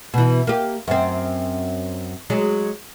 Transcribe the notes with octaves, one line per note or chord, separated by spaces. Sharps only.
B2 E3
A#3 G4
F#2 C4
F#3 G#3